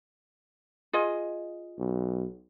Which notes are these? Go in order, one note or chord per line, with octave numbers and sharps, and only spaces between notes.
F4 G#4 D#5
B1